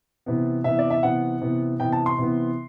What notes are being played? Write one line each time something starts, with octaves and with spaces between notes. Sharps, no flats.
C3 E3 B3
C3 E3 B3 E5
D5
E5
C3 E3 B3 F#5
C3 E3 B3
C3 E3 B3 G5
A5
C6
C3 E3 B3